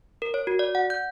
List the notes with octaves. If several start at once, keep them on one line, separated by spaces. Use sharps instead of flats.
A#4
C#5
F#4
D5
F#5
G6